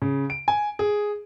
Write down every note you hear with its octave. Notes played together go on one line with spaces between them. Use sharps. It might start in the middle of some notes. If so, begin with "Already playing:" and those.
C#3
D7
G#5
G#4